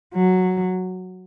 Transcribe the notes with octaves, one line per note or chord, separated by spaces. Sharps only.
F#3